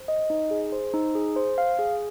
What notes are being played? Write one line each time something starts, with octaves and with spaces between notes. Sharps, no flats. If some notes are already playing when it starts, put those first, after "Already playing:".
Already playing: C5
D#5
D#4
G#4
C5
D#4
G#4
C5
F5
G#4